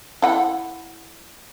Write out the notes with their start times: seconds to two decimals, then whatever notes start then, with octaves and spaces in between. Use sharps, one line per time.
0.22 E4 F#5 G5